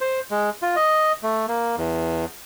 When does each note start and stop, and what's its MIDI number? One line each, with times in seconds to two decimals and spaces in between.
0.01 0.20 72
0.31 0.50 56
0.62 0.76 65
0.76 1.12 75
1.23 1.46 57
1.48 1.76 58
1.78 2.25 40